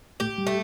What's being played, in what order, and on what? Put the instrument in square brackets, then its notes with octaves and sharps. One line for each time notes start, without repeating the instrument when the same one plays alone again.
[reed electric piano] A2 A3 [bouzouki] G4
[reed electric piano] G3
[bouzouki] A3